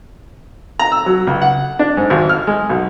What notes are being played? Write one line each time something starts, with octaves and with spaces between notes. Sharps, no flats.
A#5
E6
F#3
C#2
F#5
D4
G#2
G#1
F6
G#3
B1